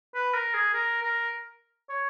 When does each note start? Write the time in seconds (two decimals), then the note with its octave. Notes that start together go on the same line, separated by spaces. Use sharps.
0.15 B4
0.34 A#4
0.54 G#4
0.74 A#4
1.02 A#4
1.89 C#5